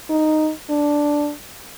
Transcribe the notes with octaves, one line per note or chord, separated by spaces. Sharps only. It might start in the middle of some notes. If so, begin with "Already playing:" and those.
D#4
D4